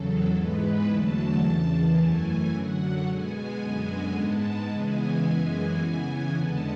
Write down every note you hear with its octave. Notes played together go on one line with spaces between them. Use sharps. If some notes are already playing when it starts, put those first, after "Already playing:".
Already playing: E2 C#3 F#3 A4
G#2 E3 G#3 B3 B4
E2 D3 F#3 A3 A5
E2 C#3 E3
F#2 E3 A3 G#5
F#2 D3 F#3 F#5
B2 G#3 B3 G#5
F#2 D3 G#3 B3 G#5
G#2 G#3 B3 A5
C#3 E3 G#3 B3 G#5
F#2 E3 G#3 B3 G#5
C#3 E3 B3 G#5
E2 D3 G#3 B3 A5